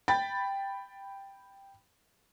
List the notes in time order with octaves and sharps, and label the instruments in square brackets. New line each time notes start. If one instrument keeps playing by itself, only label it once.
[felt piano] G5 B5 A6